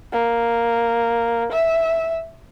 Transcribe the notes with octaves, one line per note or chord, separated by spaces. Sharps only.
A#3
E5